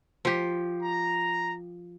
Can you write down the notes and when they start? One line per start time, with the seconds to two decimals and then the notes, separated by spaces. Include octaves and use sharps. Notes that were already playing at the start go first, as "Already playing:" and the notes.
0.25 F3 G4
0.81 A#5